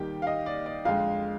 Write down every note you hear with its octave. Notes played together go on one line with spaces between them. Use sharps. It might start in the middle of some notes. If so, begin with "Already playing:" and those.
Already playing: D#2 D#3 G3 G4 G5
F5
D#5
D5
D5
F2 D3 G#3 F4 F5